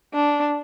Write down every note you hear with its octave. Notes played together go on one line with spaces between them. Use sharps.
D4